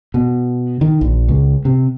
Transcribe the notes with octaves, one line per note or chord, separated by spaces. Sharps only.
B2
D#3
A#1
C#2
C3